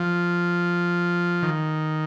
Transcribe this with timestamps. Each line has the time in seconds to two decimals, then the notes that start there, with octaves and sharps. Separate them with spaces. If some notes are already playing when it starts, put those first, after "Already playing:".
Already playing: F3
1.42 D#3